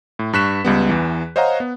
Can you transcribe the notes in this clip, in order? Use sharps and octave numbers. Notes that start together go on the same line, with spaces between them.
A2
G2 C#6 F#6 B6 E7
C#2 G3 B3
E2 E3
C5 C#5 D#5 F5 F#5 A#5
B3